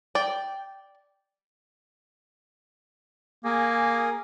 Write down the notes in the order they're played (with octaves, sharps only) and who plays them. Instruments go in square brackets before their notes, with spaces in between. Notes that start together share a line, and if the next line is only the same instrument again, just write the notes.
[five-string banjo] D5 [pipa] G5
[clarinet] A#3 [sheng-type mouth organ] G#4 A#4 G#5